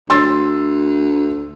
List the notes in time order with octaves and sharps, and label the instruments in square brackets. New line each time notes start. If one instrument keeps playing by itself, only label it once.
[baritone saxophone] D2 [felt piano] C6 E6 A6